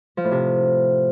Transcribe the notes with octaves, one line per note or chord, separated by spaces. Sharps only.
F3
A2
C3